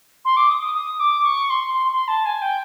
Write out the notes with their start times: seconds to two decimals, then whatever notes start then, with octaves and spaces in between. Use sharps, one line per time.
0.25 C6
0.36 D6
0.50 D#6
0.62 D#6
0.74 D#6
0.99 D6
1.24 C#6
1.50 C6
1.74 C6
1.91 C6
2.07 A5
2.25 G#5
2.41 G5